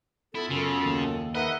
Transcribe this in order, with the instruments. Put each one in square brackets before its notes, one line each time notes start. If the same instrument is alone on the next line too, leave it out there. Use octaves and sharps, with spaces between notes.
[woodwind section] B3 F4 A4 [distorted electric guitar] E4
[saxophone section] F#2 [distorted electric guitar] C#3
[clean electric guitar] D#2
[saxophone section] D#4 A#4 B4 [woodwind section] G#4 E5 F#5 [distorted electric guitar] D#5